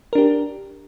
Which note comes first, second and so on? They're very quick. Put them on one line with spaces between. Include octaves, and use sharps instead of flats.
A#4 D4 G4